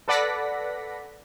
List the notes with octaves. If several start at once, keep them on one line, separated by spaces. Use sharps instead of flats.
A4 B4 D5 F#5 A#6 B6